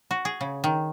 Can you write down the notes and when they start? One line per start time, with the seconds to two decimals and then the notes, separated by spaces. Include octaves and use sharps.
0.11 F#4
0.25 G#4
0.41 C#3
0.64 D#3